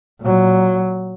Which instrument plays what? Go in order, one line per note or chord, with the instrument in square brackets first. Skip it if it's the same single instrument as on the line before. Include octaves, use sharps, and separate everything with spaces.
[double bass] A#2 F#3